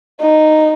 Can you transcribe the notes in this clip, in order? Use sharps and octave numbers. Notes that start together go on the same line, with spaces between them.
D#4